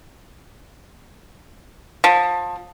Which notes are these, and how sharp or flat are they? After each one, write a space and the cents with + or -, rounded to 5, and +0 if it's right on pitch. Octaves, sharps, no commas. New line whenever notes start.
F3 +25